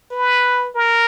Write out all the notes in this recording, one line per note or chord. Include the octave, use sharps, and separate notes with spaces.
B4
A#4